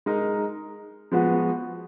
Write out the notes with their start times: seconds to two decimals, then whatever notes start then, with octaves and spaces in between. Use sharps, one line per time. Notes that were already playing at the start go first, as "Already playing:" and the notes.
0.06 G#3 D#4 A#4
1.12 F3 G#3 B3 F#4